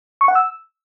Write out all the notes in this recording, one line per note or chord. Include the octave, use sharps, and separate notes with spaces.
C#6
F#5
E6